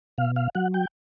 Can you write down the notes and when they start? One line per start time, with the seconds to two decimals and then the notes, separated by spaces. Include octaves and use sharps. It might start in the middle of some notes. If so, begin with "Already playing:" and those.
0.18 B2 F5
0.36 F5
0.55 F#3 F#5
0.74 G5